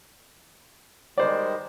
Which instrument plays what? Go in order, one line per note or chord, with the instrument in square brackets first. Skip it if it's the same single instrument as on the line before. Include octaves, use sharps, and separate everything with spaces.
[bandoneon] D#3 G3 G#3 [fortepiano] C5 D5